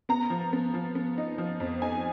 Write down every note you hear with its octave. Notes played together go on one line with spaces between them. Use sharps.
B3 A#5
F3
B3
F3
B3
D#4
F3
F2
D#4 G#5